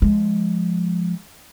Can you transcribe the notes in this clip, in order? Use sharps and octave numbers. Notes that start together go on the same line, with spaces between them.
F3 G#3